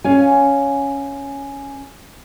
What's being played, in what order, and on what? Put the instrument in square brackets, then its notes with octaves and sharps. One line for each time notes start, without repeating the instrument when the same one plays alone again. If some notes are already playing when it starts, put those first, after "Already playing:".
[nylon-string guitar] C#4 C#5 F5 G#5